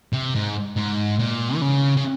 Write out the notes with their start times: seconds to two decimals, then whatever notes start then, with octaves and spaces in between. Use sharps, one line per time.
0.13 C3
0.35 G#2
0.76 G#2
1.19 A#2
1.55 E3
1.61 C#3
1.97 C#3